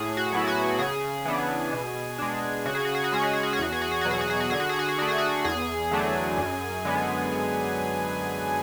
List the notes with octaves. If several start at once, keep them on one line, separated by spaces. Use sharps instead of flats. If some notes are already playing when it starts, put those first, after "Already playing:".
Already playing: A2 G#4
F#4
F#3 B3 E4
F#4
C#3 G#4
E3 B3 D4
B2
G#3 D4
C#3 F#4
G#4
F#4
G#4
F#4
G#3 C#4 G#4
F#4
G#4
F#4
G#4
E2 F#4
G#4
F#4
G#4
B2 F#3 F#4
G#4
F#4
G#4
F#4
D3 G#4
F#4
G#4
F#4
G#4
A3 D4 F#4
G#4
F#4
E2 G#4
D3 F#3 A3 D4
F#2
D3 G#3 B3